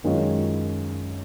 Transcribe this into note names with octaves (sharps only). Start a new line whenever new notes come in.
F#2 D#3 G#3 C#4 F4